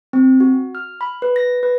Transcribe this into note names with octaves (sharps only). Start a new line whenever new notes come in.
C4
F#4
F6
B5
B4
A#6
B4